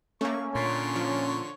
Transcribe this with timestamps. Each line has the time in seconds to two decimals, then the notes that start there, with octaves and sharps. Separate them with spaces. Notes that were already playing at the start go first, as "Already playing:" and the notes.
0.21 A3 A#3 C#4 C#6
0.55 A#2 D3 C#5 C6
0.96 F3